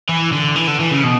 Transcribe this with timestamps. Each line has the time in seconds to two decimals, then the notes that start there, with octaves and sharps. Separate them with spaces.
0.09 E3
0.33 D3
0.56 E3
0.68 D3
0.80 E3
0.92 C#3
1.04 B2